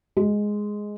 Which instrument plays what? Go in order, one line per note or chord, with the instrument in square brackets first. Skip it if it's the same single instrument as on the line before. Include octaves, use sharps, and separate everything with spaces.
[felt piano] G#3